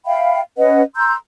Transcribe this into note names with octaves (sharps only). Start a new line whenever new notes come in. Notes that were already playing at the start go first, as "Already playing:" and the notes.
E5 F5 G5 B5
C#4 B4 D#5 F#5
A#5 C6 E6 G6